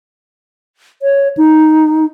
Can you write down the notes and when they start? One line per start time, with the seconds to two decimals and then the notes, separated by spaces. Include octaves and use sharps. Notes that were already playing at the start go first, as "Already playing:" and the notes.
1.02 C#5
1.37 D#4